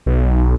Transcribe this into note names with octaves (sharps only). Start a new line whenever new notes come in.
B1